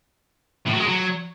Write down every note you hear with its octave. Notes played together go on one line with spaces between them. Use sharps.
A2
F#3
G#3
F#3